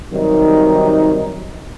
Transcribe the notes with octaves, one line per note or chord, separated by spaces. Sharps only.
C3 D#3 F#3 G3 D#4